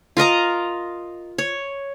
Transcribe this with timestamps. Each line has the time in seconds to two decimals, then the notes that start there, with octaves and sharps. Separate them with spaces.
0.17 F4 A#4 D#5 A#5
1.38 C#5